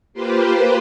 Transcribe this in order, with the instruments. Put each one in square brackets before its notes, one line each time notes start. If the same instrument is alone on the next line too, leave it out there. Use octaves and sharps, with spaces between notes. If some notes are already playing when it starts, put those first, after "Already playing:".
[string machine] A#3 F4 G4 B4 C5